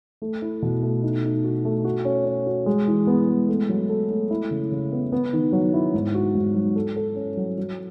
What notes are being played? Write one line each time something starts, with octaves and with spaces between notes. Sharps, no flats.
A3
E4
B2
A3
D#4
D#4
F#4
A3
F#4
C#4
C#4
F#4
G#3
E3
B3
G#3
A3
F#3
A4
A3
E4
C#3
C#3
B3
B3
D#3
F#3
E4
G#2
F#4
G#2
F#3
A4
A4
C#4
F#3
F#3